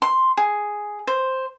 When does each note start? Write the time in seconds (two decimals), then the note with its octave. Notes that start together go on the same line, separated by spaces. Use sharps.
0.02 C6
0.37 G#4
1.07 C5